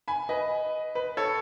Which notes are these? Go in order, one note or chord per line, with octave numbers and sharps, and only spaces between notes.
G#5 B5
B4 D#5
B4
A4 C#5